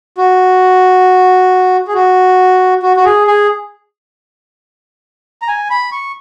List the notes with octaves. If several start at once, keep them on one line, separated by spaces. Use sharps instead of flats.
F#4
G#4
F#4
F#4
F#4
G#4
G#4
A#5
G#5
B5
C#6